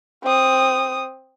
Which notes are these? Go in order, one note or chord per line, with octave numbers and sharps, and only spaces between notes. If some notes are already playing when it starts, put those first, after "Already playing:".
C4 D#6